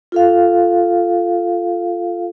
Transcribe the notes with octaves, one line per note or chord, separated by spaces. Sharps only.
F4 A4 F5